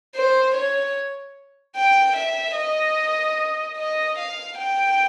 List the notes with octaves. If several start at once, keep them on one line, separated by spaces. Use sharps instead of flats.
C5
C#5
G5
E5
D#5
D#5
F5
G5